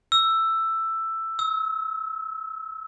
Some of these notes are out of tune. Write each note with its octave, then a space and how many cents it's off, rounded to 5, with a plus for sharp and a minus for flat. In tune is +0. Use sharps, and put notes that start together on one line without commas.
E6 +10
E6 -35